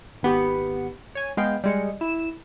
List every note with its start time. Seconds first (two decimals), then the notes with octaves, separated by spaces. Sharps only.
0.23 G#1 B3 G4 C#7
1.15 C#5 G#5
1.37 G#3 B3 F5 G5
1.64 G3 G#3 C#7
2.01 E4 E7